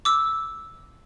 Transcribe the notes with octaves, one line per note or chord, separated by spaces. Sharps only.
D6 E6